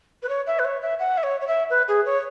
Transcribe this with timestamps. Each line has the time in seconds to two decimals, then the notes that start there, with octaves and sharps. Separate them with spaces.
0.23 B4
0.29 C#5
0.47 E5
0.59 B4
0.65 C#5
0.82 E5
0.99 F#5
1.17 E5
1.23 C#5
1.41 C#5
1.47 E5
1.70 B4
1.88 G#4
2.06 C#5